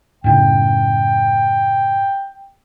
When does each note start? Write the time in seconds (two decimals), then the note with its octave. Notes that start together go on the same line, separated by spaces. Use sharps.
0.24 F#2 A2 C#3 G5